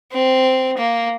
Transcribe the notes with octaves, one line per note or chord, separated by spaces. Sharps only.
C4
A#3